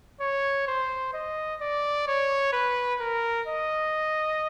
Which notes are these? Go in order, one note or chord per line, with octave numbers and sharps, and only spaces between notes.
C#5
C5
D#5
D5
C#5
B4
A#4
D#5